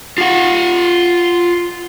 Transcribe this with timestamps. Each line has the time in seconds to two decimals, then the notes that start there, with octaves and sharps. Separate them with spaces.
0.18 F4 F#5